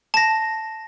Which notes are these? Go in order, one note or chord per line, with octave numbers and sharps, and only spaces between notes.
A5 A#6